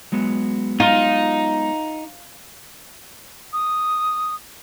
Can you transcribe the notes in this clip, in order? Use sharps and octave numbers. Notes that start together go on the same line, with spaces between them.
F#3 G#3 B3
D#4 F4
D#6